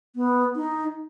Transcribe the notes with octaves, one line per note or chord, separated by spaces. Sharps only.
B3
D#4